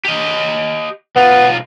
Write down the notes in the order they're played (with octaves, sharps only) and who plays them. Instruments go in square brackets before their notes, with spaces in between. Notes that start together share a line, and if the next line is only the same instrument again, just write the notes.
[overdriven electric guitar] G4 D#5
[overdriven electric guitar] B1 F4 [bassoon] B3